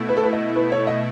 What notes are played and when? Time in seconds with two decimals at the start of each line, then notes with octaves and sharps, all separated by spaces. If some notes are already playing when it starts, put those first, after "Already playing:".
Already playing: B2 A3 E4
0.09 B4
0.17 A4
0.24 B4
0.33 D#5
0.56 B4
0.72 C#5
0.87 D#5